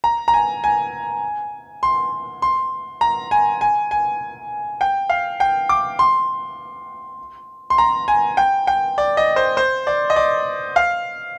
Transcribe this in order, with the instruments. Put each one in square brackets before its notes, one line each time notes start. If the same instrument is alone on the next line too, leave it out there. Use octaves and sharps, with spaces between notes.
[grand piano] A#5
A#5
G#5
G#5
C6
C6
A#5
G#5
G#5
G#5
G5
F5
G5
D6
C6
C6
A#5
G#5
G5
G5
D5
D#5
C5
C5
D5
D#5
D5
F5